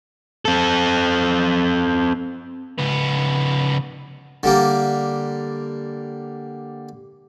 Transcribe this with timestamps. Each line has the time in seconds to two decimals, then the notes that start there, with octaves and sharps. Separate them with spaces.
0.45 C4 A4
2.79 C#2 B3
4.43 D3 G3 A#3